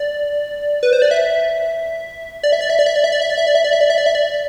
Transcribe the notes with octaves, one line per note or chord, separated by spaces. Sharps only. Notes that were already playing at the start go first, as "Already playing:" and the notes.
Already playing: D5
B4
C5
D5
E5
D5
E5
D5
E5
D5
E5
D5
E5
D5
E5
D5
E5
D5
E5
D5
E5
D5
E5
D5
E5
D5